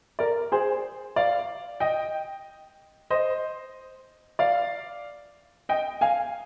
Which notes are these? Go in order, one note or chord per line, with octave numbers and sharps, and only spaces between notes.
A#4 D5
G#4 C5
D5 F5
D#5 G5
C5 D#5
D5 F5
D#5 G5
F5 G#5